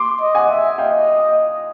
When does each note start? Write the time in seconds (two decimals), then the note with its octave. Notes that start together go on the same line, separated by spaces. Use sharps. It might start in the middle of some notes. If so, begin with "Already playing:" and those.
Already playing: C6 D6
0.21 D#5
0.35 F#5 G#5
0.49 E5
0.78 D#5 F5 G5